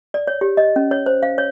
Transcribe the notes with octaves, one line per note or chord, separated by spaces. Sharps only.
D5
C#5
G4
D#5
C#4
C#5
C5
F5
C#5